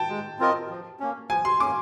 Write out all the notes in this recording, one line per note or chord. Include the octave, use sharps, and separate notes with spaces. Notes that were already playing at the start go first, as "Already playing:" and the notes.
Already playing: G5 A5
G#3
C4 F4 A#4 D#5
F3
A#3 C#4
F3 G#5
C6
A#3 C#4 D6